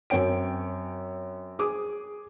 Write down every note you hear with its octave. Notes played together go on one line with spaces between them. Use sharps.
F#2 C4 C#5 G5 D7
G#4 D6 D#6